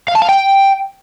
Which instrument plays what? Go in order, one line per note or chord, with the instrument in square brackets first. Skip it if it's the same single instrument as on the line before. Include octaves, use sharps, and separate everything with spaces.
[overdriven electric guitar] F5
A5
F5
G5